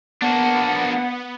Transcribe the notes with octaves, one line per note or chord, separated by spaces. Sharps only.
A#3 B3 D4 F#5